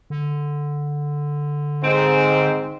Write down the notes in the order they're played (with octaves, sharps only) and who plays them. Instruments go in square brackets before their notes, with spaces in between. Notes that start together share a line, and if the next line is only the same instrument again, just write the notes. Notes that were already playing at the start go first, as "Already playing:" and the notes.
[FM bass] D3
[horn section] G#2 C4